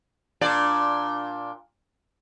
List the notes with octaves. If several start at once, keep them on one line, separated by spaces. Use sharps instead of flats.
A#2 D4 D5